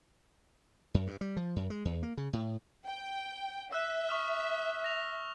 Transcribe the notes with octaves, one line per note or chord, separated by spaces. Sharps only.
F#2
G2
G3
F3
F#2
G#3
E2
A#3
C#3
A2
G5
E5 E6 F#6
C#6 D#6 F6
A#6 F7